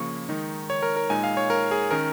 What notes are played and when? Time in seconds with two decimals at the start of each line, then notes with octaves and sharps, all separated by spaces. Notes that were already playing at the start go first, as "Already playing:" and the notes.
Already playing: C#3 F3 A#3 C#6
0.29 D#3 G#3 D#4
0.70 C#5
0.83 A#4
0.96 A#4
1.10 A#2 G#3 D#4 G#5
1.23 F5
1.37 C#5
1.50 A#4
1.71 G#4
1.91 D#3 C#4 A#4